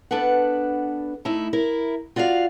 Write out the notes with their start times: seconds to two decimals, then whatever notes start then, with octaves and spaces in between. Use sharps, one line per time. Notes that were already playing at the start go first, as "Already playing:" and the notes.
0.11 B3 D4 A4 B4 F#5
1.25 A3 D#4 E4
1.53 E4 A#4
2.16 F4 F#4 D5 E5 F5